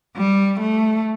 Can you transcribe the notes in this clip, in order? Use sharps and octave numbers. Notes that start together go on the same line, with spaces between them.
G3
A3